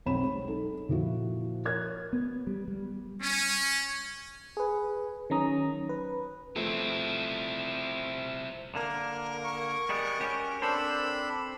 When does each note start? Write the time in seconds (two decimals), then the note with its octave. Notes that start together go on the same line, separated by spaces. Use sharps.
0.06 B1 C4 C#5 B5 E7
0.22 G#3
0.48 D#4 A4
0.89 A#2 F3 E4 F#4
1.65 A#4 C#5 F6 F#6 G#6
2.13 B3
2.47 G3
2.68 G3
3.22 C#4
4.57 G#4 B4
5.30 D#3 F#3 C#4 A#5 D#6
5.89 B4
6.56 F3 A3 C4 E4
8.75 D3 A#3 A#4
9.44 C#6
9.89 G3 G#3 B3
10.20 C#4 F#4 G4
10.62 C4 D4 A4 C5 B5 E6